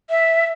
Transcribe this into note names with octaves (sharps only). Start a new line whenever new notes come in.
E5